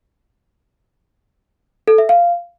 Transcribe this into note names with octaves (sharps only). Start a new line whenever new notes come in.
A4
E5
F5